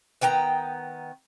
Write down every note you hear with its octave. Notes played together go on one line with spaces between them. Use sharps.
D#3 B3 G5 A#5